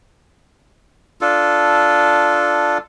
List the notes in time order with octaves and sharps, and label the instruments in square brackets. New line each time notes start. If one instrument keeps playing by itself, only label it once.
[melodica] D4 F4 A4